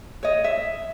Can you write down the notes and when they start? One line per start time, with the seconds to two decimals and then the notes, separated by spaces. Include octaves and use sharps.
0.23 C#5 D#5
0.44 E5